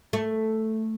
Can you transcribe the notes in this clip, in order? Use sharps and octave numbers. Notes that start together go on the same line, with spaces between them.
A3